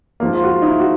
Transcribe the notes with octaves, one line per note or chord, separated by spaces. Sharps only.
G#2 F3 A#3
F4
F#4
D#4
E4
F#4